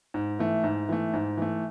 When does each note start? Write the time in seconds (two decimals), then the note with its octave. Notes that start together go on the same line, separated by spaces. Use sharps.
0.14 G#2
0.39 E3 A3
0.64 G#2
0.89 E3 A3
1.14 G#2
1.37 E3 A3